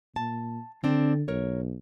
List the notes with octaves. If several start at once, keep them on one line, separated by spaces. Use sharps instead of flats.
A#2 A5
D3 C4 D4
B1 A#4 C#5